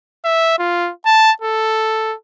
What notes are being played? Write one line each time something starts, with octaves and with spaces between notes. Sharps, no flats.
E5
F4
A5
A4